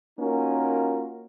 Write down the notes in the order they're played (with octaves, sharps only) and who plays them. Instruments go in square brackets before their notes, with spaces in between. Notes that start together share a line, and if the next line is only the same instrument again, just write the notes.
[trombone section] A#3 C#4 D#4 F4 F#4 A#4